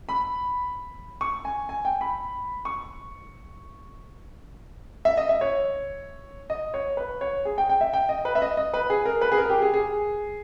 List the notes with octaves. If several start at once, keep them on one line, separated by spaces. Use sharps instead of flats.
B5
C#6
G#5
G#5
G5
B5
C#6
E5
D#5
E5
C#5
D#5
C#5
B4
C#5
G#4
G5
G5
E5
G5
D#5
B4
E5
D#5
D#5
B4
G#4
A#4
B4
G#4
A#4
G4
G#4
G#4